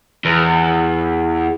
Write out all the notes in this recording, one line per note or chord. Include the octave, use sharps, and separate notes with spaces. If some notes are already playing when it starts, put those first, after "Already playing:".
E2